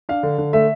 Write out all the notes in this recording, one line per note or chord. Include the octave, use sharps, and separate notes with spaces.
D4 F5
D3
D3
A3 E5